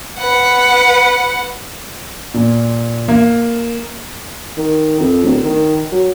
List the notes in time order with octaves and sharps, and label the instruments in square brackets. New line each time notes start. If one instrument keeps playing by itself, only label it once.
[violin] B4 F#5
[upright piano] A#2
A#3
[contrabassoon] D#3
F2
D1
D#3
F#3